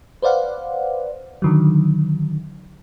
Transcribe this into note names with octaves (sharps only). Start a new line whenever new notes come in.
B4 C5 D5 F5 F#5
D3 D#3 F#3